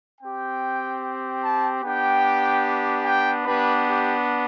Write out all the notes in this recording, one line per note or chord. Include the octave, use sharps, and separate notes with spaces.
C4 G4 G5
A5
B3 D4 G4 G5
G5
B3 D4 G4 B4
G4